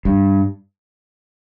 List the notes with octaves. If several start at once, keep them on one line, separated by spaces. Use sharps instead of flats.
G2